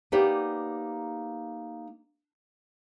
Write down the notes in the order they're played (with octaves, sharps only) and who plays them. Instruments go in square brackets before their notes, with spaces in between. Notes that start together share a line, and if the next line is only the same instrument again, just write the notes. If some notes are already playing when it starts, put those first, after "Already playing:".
[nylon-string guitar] A#3 B3 D#4 G4 D5